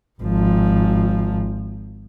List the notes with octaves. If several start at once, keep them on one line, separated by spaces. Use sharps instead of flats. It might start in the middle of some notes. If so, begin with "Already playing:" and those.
G#1 F3